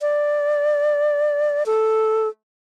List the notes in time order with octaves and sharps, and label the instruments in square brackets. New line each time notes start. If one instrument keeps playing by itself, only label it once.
[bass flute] D5
A4